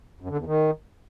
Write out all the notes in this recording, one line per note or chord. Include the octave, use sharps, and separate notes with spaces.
F#2
D3
E2
D#3